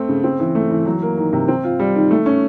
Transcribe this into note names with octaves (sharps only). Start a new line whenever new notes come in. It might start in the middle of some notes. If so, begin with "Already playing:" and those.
Already playing: A3 C4
C#3
C4
E3
A3
E3
F#3
A#3
D#3
C3
C4
F4
G3
D#3
A3
C#4